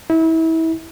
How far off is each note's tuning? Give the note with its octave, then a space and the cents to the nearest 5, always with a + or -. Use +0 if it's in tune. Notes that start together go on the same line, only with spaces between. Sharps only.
E4 -30